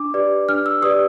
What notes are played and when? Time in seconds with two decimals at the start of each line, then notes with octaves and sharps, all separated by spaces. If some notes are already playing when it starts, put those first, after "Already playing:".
Already playing: D4 D6
0.14 G4 B4 D5
0.49 D4 F6
0.66 E6
0.82 G4 B4 D5 D#6